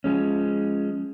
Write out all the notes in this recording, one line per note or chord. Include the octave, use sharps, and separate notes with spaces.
F3 G#3 C#4